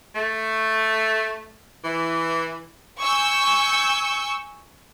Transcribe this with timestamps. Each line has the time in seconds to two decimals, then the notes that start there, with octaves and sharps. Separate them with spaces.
0.15 A3
1.84 E3
3.00 G#5 C#6 E6 G6